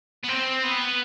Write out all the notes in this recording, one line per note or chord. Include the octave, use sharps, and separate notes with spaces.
B3
C4
B3